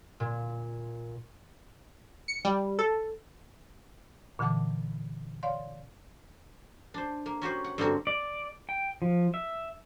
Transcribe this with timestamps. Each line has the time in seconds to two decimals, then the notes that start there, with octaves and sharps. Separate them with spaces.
0.20 A#2
2.28 C#7
2.45 G3
2.79 A4
4.39 A#2 D3 E3 F#5 A5 D6
5.43 C#5 D5 F5 C6
6.94 D4 C5
7.26 A#3
7.41 C#4 F#4 G4 C5
7.64 F#5
7.78 G2 D3 A#3 C4 F#4
8.07 D5
8.69 G5
9.02 F3
9.34 E5